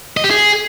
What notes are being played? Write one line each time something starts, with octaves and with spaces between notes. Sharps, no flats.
D#5
G4
G#4